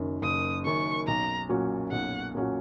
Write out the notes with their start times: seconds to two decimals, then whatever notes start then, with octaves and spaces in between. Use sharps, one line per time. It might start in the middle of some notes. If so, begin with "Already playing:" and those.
Already playing: F#1 F#2 D#3
0.22 F#1 D#6
0.65 F#2 D#3 C#6
1.07 B1 A#5
1.49 A#2 F#3 C#4 F#4
1.92 B1 F#5
2.35 A#2 F#3 C#4 F#4